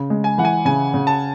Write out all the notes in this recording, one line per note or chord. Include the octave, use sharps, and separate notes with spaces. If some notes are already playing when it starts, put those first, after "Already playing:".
Already playing: C#3
G#3
G#5
E3 F#5
G#5
C#3 G#5
C#3
A5